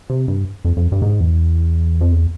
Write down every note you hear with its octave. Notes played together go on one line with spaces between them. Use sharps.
C3
G2
F2
F2
G2
G#2
E2
F2
E2